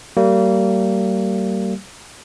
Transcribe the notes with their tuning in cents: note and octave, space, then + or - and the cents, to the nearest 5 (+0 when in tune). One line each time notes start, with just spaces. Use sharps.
G3 -35 A#3 -30